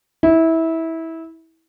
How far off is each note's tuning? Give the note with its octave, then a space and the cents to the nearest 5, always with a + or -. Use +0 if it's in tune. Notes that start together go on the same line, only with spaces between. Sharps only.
E4 -20